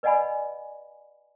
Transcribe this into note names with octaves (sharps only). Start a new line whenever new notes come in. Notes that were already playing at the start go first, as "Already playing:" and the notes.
B4 D5 D#5 F#5 G#5 B5